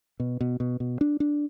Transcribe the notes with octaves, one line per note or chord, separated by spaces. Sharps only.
B2
B2
B2
B2
D4
D4